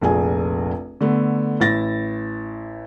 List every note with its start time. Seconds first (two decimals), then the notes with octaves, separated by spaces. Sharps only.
0.01 F1 A#1 G#4 G#5
1.01 D3 A3 B3
1.60 A1 E4 A6 A#6